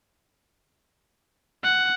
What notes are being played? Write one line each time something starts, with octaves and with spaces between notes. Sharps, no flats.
F#5